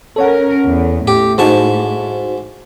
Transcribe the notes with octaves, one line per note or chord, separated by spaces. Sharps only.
C#4 A4 A#4 C#5 F#5
E2
A2 G4
G#2 D#4 F#4 C5 A5 C#6